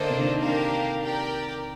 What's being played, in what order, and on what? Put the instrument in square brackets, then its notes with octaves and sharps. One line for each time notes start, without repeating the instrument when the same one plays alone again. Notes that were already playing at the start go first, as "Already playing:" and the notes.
Already playing: [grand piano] D3 [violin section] A#3 D4 A4 C5 D#5
[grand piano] C3
D3
D#3
[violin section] A#3 D4 G4 A#4 F5
G4 A#4 D5 G5